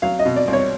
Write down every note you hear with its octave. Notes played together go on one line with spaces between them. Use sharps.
F#3 F5
D#5
B2
D5
C2
C#5